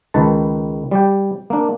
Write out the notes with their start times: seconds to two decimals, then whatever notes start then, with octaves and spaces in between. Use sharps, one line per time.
0.14 C#2 D#3 B4 A5
0.91 G3 D5 G5
1.50 A#3 D4